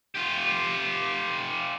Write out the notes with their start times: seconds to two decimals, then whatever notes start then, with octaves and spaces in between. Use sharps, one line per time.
0.15 F4 G4